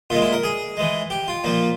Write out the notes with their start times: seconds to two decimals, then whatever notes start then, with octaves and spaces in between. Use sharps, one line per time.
0.10 A#2 G#3 F4
0.22 E4
0.33 A#4
0.44 G#4
0.77 E3 G#3
1.10 G4
1.28 F4
1.44 A#2 F3 A#3